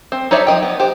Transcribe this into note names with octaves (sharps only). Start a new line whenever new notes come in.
C4
D#4 A4 C#5 D5 E5
F3 G#3 D#5 G5
B3
G4 C5